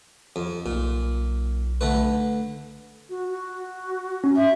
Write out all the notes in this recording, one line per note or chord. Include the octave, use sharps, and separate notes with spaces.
F2
B1 A#2
D3 A3 B4
F#4
F#4
C#4
E5